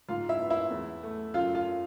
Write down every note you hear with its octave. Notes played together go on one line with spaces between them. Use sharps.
G#2 F4 F5
E4 E5
B3
E4 E5
E2
A3
F#2 F4 F5
F4 F5